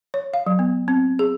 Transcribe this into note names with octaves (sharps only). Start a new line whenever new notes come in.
C#5
F5
F#3
B3
C4
G#4